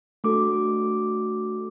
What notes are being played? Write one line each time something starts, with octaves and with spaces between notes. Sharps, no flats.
A3 D4 F#4 A4 D6